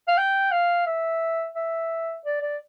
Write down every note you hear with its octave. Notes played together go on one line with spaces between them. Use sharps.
F5
G5
F5
E5
E5
D5
D5